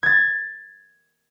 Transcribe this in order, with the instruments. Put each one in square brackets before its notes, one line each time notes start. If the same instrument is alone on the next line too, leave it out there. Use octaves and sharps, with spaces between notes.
[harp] G#6 A6